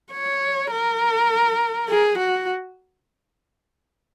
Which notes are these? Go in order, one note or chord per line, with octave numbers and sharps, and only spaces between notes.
C#5
A#4
G#4
F#4